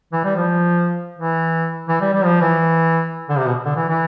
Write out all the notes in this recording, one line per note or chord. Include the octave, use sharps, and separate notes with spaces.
E3
G3
F3
E3
E3
G3
G3
F3
E3
D3
C3
B2
D3
E3
E3